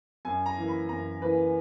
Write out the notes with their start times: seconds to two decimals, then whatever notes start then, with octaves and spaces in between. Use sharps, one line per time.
0.25 F#2 G#5
0.46 A#5
0.58 E3 A#3
0.68 B5
0.89 F#2 A#5
1.22 E3 A#3 B4